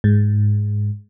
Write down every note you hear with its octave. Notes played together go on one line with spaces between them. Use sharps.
G#2